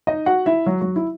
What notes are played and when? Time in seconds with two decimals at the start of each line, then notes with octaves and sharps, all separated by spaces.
0.07 D#4 D#5
0.26 F#4 F#5
0.46 E4 E5
0.66 F#3 F#4
0.81 F#3 F#4
0.96 E4